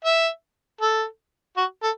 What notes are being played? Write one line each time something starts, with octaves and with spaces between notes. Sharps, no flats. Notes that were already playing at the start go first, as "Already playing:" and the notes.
E5
A4
F#4
A4